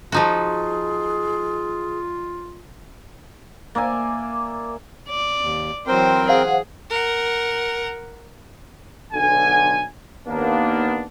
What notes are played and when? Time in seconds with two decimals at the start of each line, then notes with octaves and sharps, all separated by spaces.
0.12 F3 D#4 F4 F#4 G#4
3.75 A#3 D5 E5 G#5
5.09 D5
5.41 D#2
5.87 E3 F#3 C4 A#4 C5 G5
6.29 G#4 C5 F5 F#5
6.90 A#4 F#5
9.13 B1 D3 G#5
10.28 D#2 A#3 B3 D4